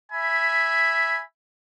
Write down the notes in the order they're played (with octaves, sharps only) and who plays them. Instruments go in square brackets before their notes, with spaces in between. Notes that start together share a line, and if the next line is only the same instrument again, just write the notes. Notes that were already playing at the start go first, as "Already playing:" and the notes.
[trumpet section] E5 G#5 B5